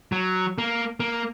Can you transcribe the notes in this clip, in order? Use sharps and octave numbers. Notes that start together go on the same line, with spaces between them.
F#3
A#3
A#3